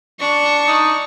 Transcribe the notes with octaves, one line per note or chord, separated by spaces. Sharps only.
D4 C#6
D#4